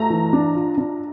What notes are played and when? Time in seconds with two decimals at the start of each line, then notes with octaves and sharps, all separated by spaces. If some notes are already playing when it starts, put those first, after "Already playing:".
Already playing: A3 A#5
0.10 E3
0.33 D4
0.55 F4
0.78 D4